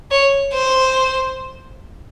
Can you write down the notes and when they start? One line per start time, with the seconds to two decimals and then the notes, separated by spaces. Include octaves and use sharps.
0.11 C#5
0.53 C5